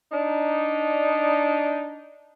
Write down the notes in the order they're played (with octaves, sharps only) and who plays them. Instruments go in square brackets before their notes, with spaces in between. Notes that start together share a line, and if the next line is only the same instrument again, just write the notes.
[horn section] D4 D#4